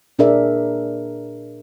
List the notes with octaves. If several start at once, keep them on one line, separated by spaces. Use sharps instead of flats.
A#2 D4 G#4 A#4 D5 E5